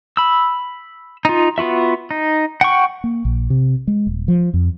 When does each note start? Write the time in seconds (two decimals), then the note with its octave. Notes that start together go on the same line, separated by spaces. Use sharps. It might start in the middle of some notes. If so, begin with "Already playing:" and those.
0.17 B5 E6
1.25 D#4 F4
1.58 B3 F4 F#4 E5
2.11 D#4
2.61 F#5 G5 C#6
3.04 A#3
3.25 A#1
3.50 C3
3.87 G#3
4.07 D#1
4.28 F3
4.54 F2